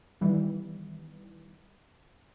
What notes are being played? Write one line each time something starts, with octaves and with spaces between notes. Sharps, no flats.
D#3 E3 G3 B3